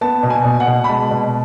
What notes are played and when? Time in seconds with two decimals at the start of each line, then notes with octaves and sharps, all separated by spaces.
0.01 B3 A5
0.23 B2
0.30 G#5
0.45 B2
0.60 F#5
0.67 B2
0.84 B5
0.89 G#3 A5
1.11 B2